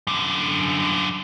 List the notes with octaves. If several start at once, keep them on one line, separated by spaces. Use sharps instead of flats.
F#2 D3